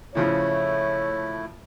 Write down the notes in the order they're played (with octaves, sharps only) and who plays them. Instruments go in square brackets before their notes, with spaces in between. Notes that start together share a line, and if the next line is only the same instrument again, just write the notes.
[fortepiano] A2 C#3 F3 [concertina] A3 E4 [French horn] C#5